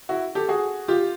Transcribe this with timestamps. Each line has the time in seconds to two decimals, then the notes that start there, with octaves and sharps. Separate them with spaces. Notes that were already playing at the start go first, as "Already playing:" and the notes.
0.09 E4 F#4
0.35 G4 A4
0.48 F#4 G#4
0.88 F4 G4